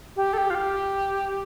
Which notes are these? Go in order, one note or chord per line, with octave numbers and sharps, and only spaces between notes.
G4
A4
G4
F4
G4